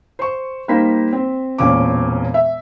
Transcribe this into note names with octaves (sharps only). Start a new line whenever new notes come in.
C5 C#6
G3 A#3 D#4 C5 B6
C4 C5
E1 A#2 C4 C#4 D6
E5